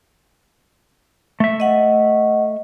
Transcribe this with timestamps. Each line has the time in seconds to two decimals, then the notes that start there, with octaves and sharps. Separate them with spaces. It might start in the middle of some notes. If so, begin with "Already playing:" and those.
1.40 A3 E5
1.60 D#5 F#5